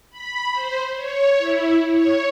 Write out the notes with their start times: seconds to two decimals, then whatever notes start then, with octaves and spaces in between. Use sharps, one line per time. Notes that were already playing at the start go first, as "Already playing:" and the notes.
0.10 B5
0.53 C5
0.95 C#5
1.37 E4
1.87 C#5